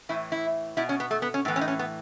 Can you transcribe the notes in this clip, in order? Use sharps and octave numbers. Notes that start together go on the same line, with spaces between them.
A2 E3 E4
E4
B2 E4
C#4
B3
A3
B3
C#4
A2 E3 B3
C#4
D#4
C#4
B3